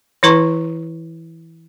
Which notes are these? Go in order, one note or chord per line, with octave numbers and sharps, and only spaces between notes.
E3 E4 B4 A#5 C#6